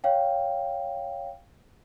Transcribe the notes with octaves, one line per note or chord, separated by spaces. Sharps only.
C#5 F5 G5